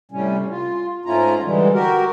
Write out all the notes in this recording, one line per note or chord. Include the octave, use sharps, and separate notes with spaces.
A2 C3 G3 C#4
F4
G#2 A3 C#4 E4 F4 A#5
D3 E3 G3 G#3
F#4 G4 A#4